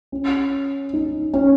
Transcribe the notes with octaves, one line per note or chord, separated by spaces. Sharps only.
C#4
D#4
C#4